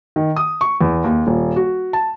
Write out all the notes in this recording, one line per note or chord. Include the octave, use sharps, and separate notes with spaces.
D#3
D#6
C#6
E2
D#2
D#1
F#4
A5